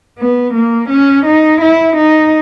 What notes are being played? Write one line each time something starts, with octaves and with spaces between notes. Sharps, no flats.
B3
A#3
C#4
D#4
E4
D#4